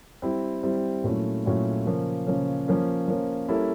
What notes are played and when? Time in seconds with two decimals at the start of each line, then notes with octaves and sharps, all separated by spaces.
0.22 G3 C4 E4
0.63 G3 C4 E4
1.04 A#2 F#3 A3 C#4 E4
1.45 A#2 F#3 A3 C#4 E4
1.86 C#3 F3 A#3 C#4
2.27 C#3 F3 A#3 C#4
2.68 F3 A#3 C#4
3.08 F3 A#3 C#4
3.48 G3 A#3 C#4 E4 A4